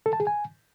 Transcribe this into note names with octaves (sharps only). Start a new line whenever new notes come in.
A4
A5
G#4
G#5